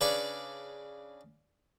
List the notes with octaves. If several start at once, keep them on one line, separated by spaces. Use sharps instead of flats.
C#3 D4 B4 D5 C#6